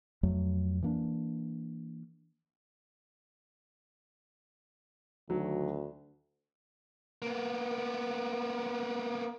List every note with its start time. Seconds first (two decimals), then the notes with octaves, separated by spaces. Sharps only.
0.23 F2 F#3 A3
0.82 E3 A#3 D4
5.30 D2 D#3 F#3
7.22 A#3 B3